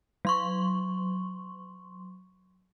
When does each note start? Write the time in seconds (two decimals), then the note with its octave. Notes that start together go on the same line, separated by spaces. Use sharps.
0.25 F#3 C6 C#6